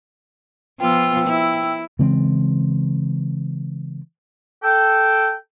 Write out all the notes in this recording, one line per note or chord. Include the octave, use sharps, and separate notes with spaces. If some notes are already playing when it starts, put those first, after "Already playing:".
F3 B3 F4 G5 E6
E4
C#3 E3 G#3 C4
A4 G5